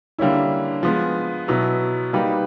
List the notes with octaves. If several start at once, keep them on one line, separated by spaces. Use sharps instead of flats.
D3 G3 A#3 C#4 E4
F3 G#3 B3
B2 F#3 B3 E4
G3 A#3 D#4 G4 B4